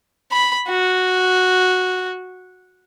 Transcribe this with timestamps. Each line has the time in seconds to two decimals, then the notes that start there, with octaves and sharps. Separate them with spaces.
0.32 B5
0.68 F#4